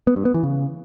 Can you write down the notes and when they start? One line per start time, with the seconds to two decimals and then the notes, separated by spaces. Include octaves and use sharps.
0.07 B3
0.16 G2
0.25 B3
0.34 E3
0.43 C#3